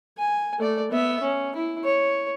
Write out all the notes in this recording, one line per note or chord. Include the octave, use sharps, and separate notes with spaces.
G#5
A3 D5
B3 E5
C#4
E4
C#5